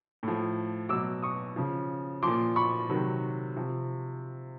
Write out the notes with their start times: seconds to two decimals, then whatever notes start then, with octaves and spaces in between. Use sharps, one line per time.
0.23 A2 F3
0.89 B2 F#3 D6 E6
1.22 C#6 D#6
1.56 C#3 F3
2.23 A#2 F3 C6 D6
2.56 B5 C#6
2.89 C3 D#3 F#3
3.56 C3 F3